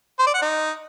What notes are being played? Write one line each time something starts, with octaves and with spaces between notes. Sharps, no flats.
C5
D5
F#5
D#4